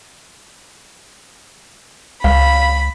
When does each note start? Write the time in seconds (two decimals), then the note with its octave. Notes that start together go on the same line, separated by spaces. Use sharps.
2.24 C#2 F5 B5